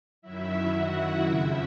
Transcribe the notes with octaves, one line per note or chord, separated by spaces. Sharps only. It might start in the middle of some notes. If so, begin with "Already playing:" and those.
F#2 D#3 F#3 E4 E5
F#4 F#5
F2 C#3 F3 E4 E5